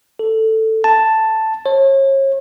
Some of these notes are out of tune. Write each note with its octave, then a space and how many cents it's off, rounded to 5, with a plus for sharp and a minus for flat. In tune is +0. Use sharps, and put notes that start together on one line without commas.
A4 +10
A5 +5
C#5 -35